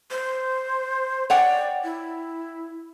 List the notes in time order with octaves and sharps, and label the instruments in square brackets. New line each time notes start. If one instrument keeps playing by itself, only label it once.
[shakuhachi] C5
[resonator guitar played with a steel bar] C#5 F#5 G5 [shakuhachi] D5
[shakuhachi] E4